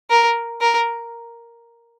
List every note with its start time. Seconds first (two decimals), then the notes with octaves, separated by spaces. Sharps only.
0.10 A#4
0.61 A#4